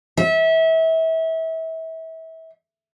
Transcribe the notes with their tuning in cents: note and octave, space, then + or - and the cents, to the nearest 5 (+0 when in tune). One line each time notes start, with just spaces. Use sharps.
E5 -30